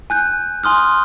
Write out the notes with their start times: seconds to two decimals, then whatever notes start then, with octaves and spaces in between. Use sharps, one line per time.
0.10 G#5 F#6 G6
0.64 G#5 C6 D#6 F6